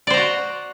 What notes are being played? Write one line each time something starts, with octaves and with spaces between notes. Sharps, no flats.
F#4 C5 D5 A#5